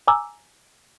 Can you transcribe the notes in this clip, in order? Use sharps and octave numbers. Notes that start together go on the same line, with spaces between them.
G#5 A#5 D6 E6